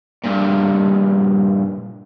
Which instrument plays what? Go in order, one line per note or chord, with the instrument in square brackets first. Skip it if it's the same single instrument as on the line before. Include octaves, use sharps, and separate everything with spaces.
[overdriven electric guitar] G2 A#2